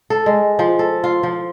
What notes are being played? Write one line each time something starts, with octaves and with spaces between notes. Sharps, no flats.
A4
G#3
F3
A4
F4
F3